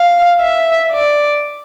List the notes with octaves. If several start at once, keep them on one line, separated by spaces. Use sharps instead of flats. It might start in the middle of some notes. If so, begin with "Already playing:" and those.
Already playing: F5
E5
D5